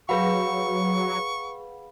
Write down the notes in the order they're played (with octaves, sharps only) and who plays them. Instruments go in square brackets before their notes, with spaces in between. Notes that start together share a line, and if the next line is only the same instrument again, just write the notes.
[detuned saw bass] F#3 [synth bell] G#4 B4 F#5 [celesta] F5 B5 [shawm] C#6